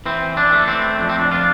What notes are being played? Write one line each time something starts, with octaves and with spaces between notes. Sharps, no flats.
E3 C4
D4
A3
C4
F2 D4
C4
D4
D4 F4